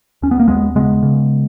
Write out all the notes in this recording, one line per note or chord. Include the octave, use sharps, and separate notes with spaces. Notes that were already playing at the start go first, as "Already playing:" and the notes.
D#2 C#4
B3
A#3
D#2 G#3 B3
C#3 G#3 B3
C#3